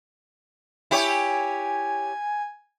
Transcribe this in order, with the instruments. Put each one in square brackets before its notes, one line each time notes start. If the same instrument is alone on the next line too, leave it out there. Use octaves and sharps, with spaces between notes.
[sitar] E4 G4 C#5 [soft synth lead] G#5